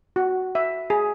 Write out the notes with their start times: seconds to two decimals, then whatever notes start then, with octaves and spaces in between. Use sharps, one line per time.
0.16 F#4
0.55 E5
0.90 G#4